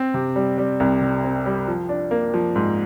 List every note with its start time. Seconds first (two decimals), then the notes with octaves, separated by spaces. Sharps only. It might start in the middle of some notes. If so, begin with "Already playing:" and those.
Already playing: C4
0.14 C3
0.36 G3
0.58 G3
0.80 C2
1.01 C3
1.24 C4
1.46 G3
1.68 F3
1.89 D4
2.11 A#3
2.34 F3
2.56 G#2